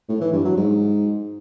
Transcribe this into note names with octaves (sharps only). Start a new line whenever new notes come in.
A2
E3
G2
F#3
G#2